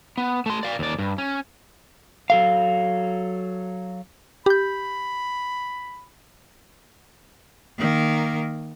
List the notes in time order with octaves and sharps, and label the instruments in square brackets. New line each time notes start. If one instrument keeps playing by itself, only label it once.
[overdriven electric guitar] B3
A3 C6
D5 F5
D#2 D5
G2
C#4
[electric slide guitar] F#3 A4 F5
[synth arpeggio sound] G4 G6 [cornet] B5
[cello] D#3 A#3